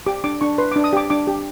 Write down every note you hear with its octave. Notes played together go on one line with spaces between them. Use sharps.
G4 D6
D4 D6
D4 C#6
B4 C6
D4 D6
D#6
G4 D6
D4 D6
G4